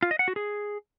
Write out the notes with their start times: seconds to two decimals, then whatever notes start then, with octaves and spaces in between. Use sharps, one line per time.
0.02 F4
0.11 D#5
0.19 F#5
0.28 F#4
0.36 G#4